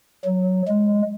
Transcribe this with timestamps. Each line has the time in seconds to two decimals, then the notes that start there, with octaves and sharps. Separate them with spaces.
0.25 F#3
0.68 G#3